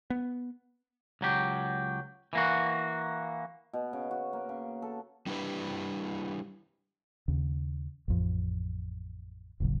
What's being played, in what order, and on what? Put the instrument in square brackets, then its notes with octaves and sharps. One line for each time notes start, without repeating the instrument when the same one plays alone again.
[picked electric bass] B3
[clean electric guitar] C#2 F#3 G4
E3 A#3 F#4
[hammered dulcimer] B2
C#3
F#4
A#3
C#3
A4
[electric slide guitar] G3 D4 E4 G4 B4
[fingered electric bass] D#2 C#3
A1 F2
D#1 A1 C#3 F#3